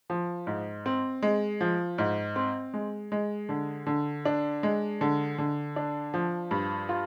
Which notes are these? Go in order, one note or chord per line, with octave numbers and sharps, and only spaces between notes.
F3
G#2
C4
G#3
F3
G#2
C4
G#3
G#3
D3
D3
D4
G#3
D3
D3
D4
F3
G2
F4